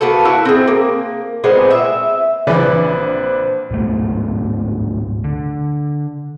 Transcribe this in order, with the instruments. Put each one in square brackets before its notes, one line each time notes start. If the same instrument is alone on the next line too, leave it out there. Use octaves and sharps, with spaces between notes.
[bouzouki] A#3 B3 F#4 A4
E4 F#4 E5 A5
C4 G#4
A#3
A#2 G#3 B3 C4
E5
[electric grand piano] A#1 B4 D5 [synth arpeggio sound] C#3 E3 [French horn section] C4 D4 C5
[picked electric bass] D1 G#1 B2 A3
D3